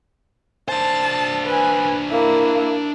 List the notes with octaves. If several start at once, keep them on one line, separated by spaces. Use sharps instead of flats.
D4 C5 A5
B4 G#5
A#3 E4